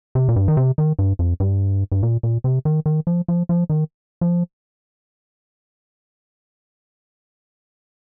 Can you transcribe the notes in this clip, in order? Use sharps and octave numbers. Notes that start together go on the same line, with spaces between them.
C3
A#2
G2
D#3
C3
D#3
G2
F2
G2
G2
A#2
A#2
C3
D#3
D#3
F3
F3
F3
D#3
F3